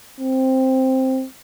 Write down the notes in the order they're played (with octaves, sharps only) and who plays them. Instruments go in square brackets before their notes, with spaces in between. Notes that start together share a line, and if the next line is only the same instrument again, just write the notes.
[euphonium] C4